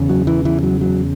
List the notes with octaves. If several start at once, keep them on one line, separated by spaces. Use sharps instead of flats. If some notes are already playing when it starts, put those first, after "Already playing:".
Already playing: E2 C#3
F#3
E3
E3
F#3
F#3